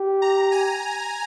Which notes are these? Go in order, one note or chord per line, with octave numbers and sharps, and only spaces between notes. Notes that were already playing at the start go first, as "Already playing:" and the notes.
Already playing: G4
A#5
G#5